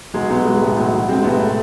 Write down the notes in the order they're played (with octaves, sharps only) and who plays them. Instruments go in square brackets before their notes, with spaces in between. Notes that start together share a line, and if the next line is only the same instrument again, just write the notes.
[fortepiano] B1 [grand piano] G#3
[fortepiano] B1 [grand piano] B3
[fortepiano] G#3
A2
B1
B1
[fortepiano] G#3 [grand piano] C4
[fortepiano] A2 [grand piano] B3
[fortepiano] C3 [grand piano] A3